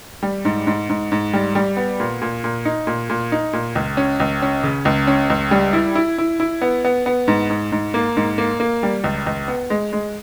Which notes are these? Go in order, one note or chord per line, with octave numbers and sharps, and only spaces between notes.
G3
G#2
G#2
G#2
G#2
G3
G3
B3
A#2
A#2
A#2
D#4
A#2
A#2
D#4
A#2
C#2
C#4
C#2
C#4
C#3
C#2
C#4
C#2
G3
E4
E4
E4
E4
B3
B3
B3
G#2
G#2
G#2
A#3
G#2
A#3
A#3
G3
C#2
C#2
B3
G#3
G#3